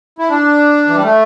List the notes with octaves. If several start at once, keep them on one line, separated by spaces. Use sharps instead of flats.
E4
D4
E3
G3
A3